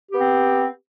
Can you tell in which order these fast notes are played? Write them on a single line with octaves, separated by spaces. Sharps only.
G4 B3 C4